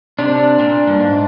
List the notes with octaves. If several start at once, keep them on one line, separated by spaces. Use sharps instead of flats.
C3 D4
A#2
G2
G#2